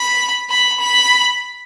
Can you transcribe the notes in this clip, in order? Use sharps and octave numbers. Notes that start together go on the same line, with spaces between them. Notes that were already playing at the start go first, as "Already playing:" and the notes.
Already playing: B5
B5
B5